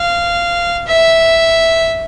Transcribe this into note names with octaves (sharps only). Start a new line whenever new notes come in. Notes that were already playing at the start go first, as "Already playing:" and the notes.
Already playing: F5
E5